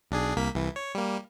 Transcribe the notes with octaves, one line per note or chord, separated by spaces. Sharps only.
B1 D4 G#4
C2 A#3 B6
C2 E3
C#5
G3 A#3